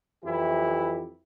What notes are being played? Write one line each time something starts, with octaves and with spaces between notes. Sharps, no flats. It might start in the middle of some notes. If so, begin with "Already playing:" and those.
F2 E3 F#3 E4 G4